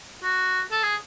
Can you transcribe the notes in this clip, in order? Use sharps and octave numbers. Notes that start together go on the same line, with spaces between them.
F#4
A4
G#4